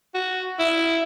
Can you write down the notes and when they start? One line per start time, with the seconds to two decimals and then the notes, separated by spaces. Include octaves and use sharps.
0.14 F#4
0.59 E4